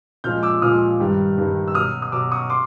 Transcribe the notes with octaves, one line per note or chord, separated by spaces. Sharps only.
A#2 F3 G#3 F6 G6
D6 E6
A#2 F3 G#3 D#6 F6
G2 D#3 G3
G2 D#3 G3
E6
B2 F#3 D#6 F6
D#6
B2 F#3 D6 E6
C#6 D#6
C6 D6